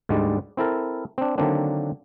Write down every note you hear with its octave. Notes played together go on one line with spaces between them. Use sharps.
D2 G#2 D3 G3 G#3 D5
C4 E4 A4 A#4
C4 D4
D3 D#3 F#3 A#3 C4 D4